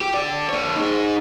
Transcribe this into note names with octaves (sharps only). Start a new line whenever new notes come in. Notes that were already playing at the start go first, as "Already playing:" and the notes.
G4
A4 D5
A#3 C#5
D#4 G#4